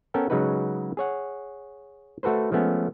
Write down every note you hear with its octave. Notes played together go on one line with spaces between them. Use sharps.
B3 C#4 A4 A#4 G5
C#3 F#3 G#3 D#4 F#4 B4
G#4 C#5 F#5
A3 F#4 A4 B4 C5
F3 G#3 A3 B3 C#4